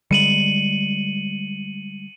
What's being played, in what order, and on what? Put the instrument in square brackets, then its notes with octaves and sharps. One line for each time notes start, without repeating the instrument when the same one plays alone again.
[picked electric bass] D3 G3 G#3 [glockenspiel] C#7 D#7 F#7